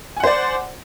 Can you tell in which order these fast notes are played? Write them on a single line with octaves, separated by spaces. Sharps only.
G#5 F#5 C5 D5